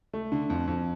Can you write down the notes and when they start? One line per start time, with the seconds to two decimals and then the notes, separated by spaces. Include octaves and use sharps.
0.14 A3
0.32 D3
0.50 F2
0.68 F2